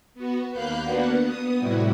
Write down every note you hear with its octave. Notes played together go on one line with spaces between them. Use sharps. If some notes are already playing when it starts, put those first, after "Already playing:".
B3 F#4
D#2 A#3 F5 B5 F#6 G6
A#3 B3 D4 F#4 B4 F#5
B3 D#6
A2 C3 G3 E4 F#4